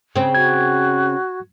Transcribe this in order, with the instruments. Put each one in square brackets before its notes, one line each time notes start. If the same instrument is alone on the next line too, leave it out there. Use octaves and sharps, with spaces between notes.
[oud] C#3 C4
[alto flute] F#4 [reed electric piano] G#6